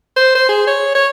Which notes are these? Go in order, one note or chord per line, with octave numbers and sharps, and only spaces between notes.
C5
C5
G#4
C#5
C#5